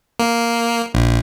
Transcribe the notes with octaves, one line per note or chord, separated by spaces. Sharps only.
A#3
A#1